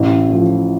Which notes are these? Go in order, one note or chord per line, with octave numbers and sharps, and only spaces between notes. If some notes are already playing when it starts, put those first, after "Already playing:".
Already playing: A1
A2 F3